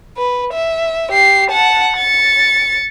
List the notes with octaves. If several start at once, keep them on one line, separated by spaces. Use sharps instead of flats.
B4
E5
G4 C7
F#5 A5
A6 C#7